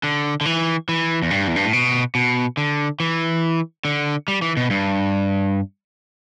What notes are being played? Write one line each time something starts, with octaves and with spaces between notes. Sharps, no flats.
D3
D3
E3
E3
E2
G2
E2
G2
A2
B2
B2
D3
E3
D3
G3
E3
B2
G2